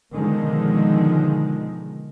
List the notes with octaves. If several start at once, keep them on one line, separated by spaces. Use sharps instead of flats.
B2 D3 D#3 F3 G#3